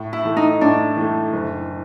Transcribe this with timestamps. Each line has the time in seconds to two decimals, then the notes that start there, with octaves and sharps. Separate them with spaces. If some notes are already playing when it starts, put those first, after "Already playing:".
Already playing: A2
0.13 E4
0.25 E3 A3
0.37 D#4
0.61 A2 D4
0.96 E3 A3
1.33 F#1